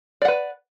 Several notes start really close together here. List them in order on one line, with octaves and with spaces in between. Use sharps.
D5 F#5 B4